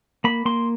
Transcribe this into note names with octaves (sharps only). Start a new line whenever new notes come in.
A#3 B5
A#3 C6